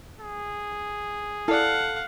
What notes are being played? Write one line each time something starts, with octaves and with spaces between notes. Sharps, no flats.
G#4
E4 A4 D5 F5 F#5